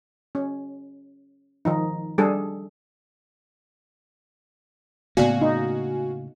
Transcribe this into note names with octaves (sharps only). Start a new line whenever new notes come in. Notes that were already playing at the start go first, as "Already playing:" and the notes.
C#4
D#3 F3 D#4
G3 D4 G#4 A4
A2 C#3 A#3 B3 F#4 D5 F5 G#5
D#4